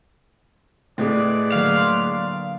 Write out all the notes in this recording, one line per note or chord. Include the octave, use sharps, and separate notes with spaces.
A2 G#3 G#4 B4 D5 G6
D3 F#3 A#3 F5
C6 F6 F#6